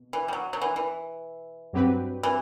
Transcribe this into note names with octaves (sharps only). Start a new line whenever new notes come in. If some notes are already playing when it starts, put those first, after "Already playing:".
Already playing: B2
E3
G3
F#3
F#3
E3
E3
G2 F#3 C4 G4 B4
E3